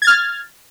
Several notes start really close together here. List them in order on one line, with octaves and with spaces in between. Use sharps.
G#6 A6 F6